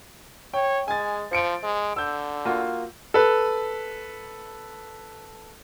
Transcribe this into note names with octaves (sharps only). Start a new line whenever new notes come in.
C#5 G5
G#3 G#5 A6
F3 C5 C#7 D7
G#3
D3 E6 G6
A#3 F4 F#4
A4 B4